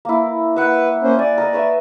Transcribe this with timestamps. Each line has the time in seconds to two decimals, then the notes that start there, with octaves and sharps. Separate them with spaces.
0.05 A#3 E4
0.56 B4 E5 F#5
1.03 A#3 C#4 C5
1.19 D5 G#5
1.38 A#4 D#5 G#5
1.53 B4 C#5 E5